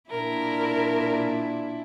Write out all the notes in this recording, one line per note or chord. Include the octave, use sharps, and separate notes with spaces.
A#2 D4 E4 A#4